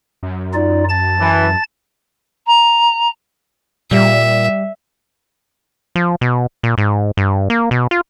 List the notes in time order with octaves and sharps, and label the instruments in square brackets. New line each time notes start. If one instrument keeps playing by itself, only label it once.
[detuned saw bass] F#2
[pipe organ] D#4 F4 D5
A5 A6
[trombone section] E3
[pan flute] A#5
[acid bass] A#2 [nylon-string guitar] G3 [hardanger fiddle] E5
[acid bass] F3
B2
A#2
G#2
G2
A#3
B2
F4